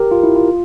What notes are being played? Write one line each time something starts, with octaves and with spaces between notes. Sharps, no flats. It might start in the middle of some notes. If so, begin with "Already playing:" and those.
Already playing: G4 A#4
F4
E4
F4